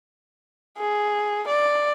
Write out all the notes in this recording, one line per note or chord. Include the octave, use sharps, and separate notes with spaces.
G#4
D5